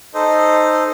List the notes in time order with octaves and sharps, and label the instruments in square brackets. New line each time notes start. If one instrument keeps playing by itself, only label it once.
[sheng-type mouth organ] D#4 A4 C5 D#5